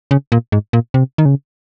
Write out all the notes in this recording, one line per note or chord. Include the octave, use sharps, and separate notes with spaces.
C#3
A#2
G#2
A#2
C3
D#3
C#3